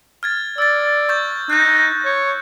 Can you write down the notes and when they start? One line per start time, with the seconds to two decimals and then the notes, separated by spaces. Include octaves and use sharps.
0.23 F6 G#6 A6
0.58 D5 E6 A6
1.09 C#6 G6 A6
1.50 D#4 F#6 G6
2.05 C#5